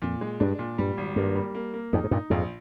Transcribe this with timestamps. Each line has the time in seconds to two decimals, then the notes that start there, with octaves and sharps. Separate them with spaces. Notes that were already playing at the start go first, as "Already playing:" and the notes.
0.02 F2 A#2
0.21 G#3
0.40 G2 D4
0.59 A#2
0.78 G2 G3
0.97 G#1
1.16 G2 A#3
1.36 G3
1.55 A#3
1.73 A#3
1.93 F2 G#2 D#4
2.04 G#2
2.11 G2 A#2 D#4
2.30 A#1 F2 G#2